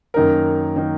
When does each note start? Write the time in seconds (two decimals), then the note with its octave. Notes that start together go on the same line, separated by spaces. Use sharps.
0.14 F#2 D#3 A#3 D#4 A#4
0.76 D#3 A#3 D#4 A#4